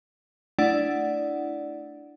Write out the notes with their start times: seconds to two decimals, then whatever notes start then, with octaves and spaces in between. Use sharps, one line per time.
0.59 A3 D4 E4 D5 F#5